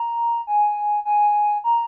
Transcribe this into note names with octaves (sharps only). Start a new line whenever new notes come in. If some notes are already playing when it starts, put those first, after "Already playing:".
Already playing: A#5
G#5
G#5
A#5